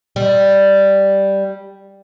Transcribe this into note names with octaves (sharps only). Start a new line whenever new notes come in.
G3